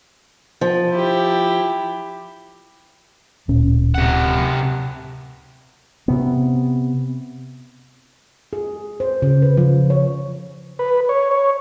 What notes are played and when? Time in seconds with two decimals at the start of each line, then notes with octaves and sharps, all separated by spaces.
0.61 F3
0.92 E4 G4
3.48 D1 A#2 C#4
3.95 C3 F#5
6.08 C3 B3
8.53 G#4
9.00 C5
9.22 C#3
9.42 B4
9.57 F3
9.90 C#5
10.79 B4
11.09 C#5
11.31 C#5